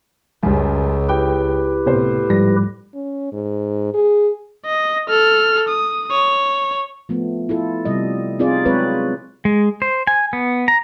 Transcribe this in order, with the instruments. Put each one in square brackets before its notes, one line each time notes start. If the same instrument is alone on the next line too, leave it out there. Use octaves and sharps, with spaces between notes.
[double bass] C#2 [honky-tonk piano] F#2 G3
[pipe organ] E4 G4 B4 [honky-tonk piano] G5
[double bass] A2 [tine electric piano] C3 [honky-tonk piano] B3 C5
[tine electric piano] G#2 F3 G3 [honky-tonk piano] A#6
[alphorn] C#4
G#2
G#4
[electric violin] D#5
A4 F6
D#6
C#5
[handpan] F3 A3 B3
E4 F4 A4
C3 G3 D#5
C4 D#4 F4 G#4 D5
F#3 G#3 C4 G#4 B4 C#5
[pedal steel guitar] G#3
C5
G#5
B3
A#5